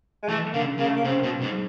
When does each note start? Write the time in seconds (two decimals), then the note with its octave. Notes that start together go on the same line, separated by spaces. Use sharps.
0.23 G#3
0.28 E3 A3
0.53 D3 A#3
0.79 C#3 A#3
0.87 A3
0.96 A#3
1.04 C#3 C4
1.23 B2
1.42 G#2